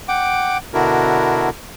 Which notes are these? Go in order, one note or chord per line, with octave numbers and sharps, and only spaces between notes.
F#5 G5 D6
B2 D3 D4 E4 F#4 A#4